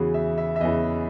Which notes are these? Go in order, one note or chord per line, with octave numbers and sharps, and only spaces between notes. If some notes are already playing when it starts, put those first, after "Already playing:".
Already playing: E2 C#3 E3 F#4 G#4
E5
E5
E5
E2 C#3 E3 D#5